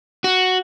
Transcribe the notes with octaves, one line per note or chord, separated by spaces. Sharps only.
F#4